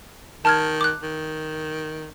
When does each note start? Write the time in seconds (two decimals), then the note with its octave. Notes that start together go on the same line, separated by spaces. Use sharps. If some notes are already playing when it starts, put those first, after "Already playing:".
0.45 D#3 A5 F6 G#6
0.81 D6 F#6
1.03 D#3